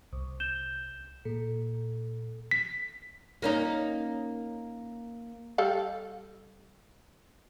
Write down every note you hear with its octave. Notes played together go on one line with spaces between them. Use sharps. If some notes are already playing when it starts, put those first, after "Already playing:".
C2
G6 E7 G7
A#2 A4
B6
A#3 C#4 D#4
G3 A4 F5